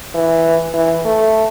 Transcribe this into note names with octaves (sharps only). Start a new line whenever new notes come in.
E3
E3
A3